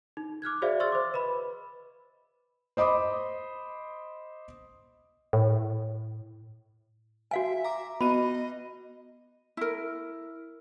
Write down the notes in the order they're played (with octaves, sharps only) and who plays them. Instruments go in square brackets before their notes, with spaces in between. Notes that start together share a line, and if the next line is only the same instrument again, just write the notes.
[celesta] D#4
D6 F6 F#6 G#6
F#4 G#4 C5 D5 E5 F5
C6 C#6 E6 F6 A6
C5 D6
B4 D#5 B5
[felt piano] C5 D#5 B5 D6 D#6
[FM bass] A2
[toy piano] F#4 F5 G#5 [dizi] E5
[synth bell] A#5 D6
[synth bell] B3 F#4 D#7 [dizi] D#5 [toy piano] B5
[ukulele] E4 A#4